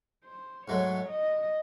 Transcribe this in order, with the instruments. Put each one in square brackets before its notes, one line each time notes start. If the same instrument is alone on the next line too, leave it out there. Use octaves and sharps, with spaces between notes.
[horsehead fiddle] C5
[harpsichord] G#2 F#3 A3 [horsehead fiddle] C#5
[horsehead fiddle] D#5